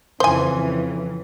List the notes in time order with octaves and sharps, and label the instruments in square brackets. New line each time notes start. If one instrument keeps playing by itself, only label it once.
[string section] F2 C#3 E3 [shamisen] C5 G#5